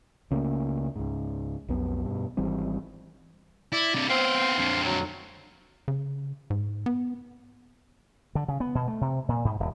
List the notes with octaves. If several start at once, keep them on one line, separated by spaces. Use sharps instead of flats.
C#2 C#3 A3 A#3
C#2 G#2
B1 F2 B3
G2 B2
G#1 E3 G3 C4
E4 D5
C3 D4
B3 C4 C5 F5
F2 D3
F#3
C#3
G#2
B3
D3
C#3
B3
B2
A3
C3
A#2
G#2
D#1